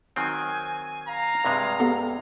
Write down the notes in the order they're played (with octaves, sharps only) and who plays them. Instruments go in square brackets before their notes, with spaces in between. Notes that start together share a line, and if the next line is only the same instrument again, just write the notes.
[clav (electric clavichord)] D#3 F#3 C4 [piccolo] G#5
[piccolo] F5 [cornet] A#5
[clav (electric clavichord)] G2 C3 G#3
[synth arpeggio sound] B3 G4 A4